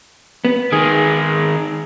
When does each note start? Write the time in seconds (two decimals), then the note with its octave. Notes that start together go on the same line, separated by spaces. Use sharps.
0.45 B3
0.72 D#3 G#3 G#4